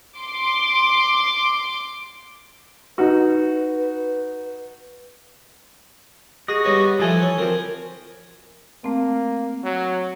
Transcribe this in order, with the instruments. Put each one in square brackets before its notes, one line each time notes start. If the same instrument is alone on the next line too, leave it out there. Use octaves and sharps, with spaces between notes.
[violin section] C6 D6
[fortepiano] D#4 F#4 [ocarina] B4
[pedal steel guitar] F#4 D#5 [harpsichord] G#4
[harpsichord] G3 B3 C#5
[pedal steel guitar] E3 G#5 [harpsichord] F3 A3 A4
[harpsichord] C#5
[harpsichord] F3 A#4 [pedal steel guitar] C4
[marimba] A3 C4 [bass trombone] A#3
[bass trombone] F#3